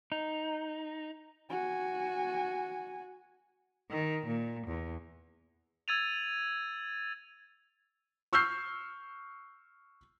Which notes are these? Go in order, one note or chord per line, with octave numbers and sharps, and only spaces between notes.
D#4
F#4 G#5
D#3
A#2
E2
E6 G#6 A6 D#7 F7
C#6 E6 F6 G6 C7